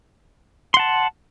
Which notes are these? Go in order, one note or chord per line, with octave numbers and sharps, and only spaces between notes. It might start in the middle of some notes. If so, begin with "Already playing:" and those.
F#5 A5 C6